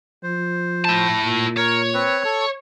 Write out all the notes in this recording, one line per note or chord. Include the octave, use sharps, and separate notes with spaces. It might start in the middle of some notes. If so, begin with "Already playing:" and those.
F3 C5
E4 A5
A#2
A#4 C#5
C4 B4 C#6
A4